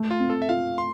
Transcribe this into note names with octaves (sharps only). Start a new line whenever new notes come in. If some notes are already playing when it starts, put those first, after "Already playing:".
Already playing: A3
F4
C4
A4
E5
F4 F5
C6